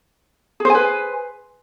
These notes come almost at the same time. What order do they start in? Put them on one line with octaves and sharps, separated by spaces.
G#4 C5 G#5 B4